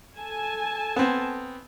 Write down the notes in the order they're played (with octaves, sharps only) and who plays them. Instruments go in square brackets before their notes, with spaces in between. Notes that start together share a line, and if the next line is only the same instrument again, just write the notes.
[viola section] A4 G#5 A5
[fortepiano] B3 C4